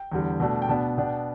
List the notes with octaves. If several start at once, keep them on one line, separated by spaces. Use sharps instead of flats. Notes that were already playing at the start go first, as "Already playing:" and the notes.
Already playing: G5
E2 D3 G3
B2 A3 D4
G5
B2 B3 D4 A5
B2 B3 D4 G5